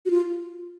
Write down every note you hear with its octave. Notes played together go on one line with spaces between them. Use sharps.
F#4
F4